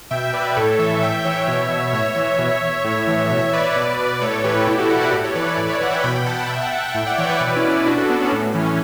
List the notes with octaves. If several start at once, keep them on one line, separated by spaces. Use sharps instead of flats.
B2 E5 G5
B4 D5
B4
A2 A4 C#5
E3 C#5 E5
A2 E5 G5
E3 C#5 E5
B2
A2 C#5 E5
E3
B2
A2
E3
B2 C#5 E5
B4 D5
B2
A2 A4 C#5
E3 G4 B4
B2 E4 G4
F#4 A4
D5 F#5
B4 D5
A2
A4 C#5
E3 B4 D5
A4 C#5
A2 B4 D5
C#5 E5
E3 F#5
E5 G5
B2 G5 B5
G5 B5
F#5 A5
F#5 A5
B2 E5 G5
F#5 A5
F#5 A5
F#5 A5
A2 E5 G5
D5 F#5
E3 C#5 E5
B4 D5
B2 B4 D5
C#4 E4
C#4 E4
B2 D4 F#4
F#4 A4
B3 D4
C#4
A2
E3 C#4
C#4